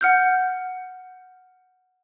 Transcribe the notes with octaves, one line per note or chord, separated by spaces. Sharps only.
F#5 F6 G6